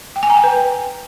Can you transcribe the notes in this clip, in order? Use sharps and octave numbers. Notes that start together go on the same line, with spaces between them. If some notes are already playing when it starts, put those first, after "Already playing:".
G5
G#5
A#5
G5
B4